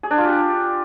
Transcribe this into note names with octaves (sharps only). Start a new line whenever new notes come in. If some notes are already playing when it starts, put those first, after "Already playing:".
G#4
D4
F4
G4